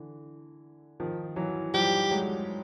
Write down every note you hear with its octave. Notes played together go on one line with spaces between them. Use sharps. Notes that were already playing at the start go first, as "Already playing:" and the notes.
Already playing: D3 E3
D#3 F3
E3 F#3
F3 G3 G4
F#3 G#3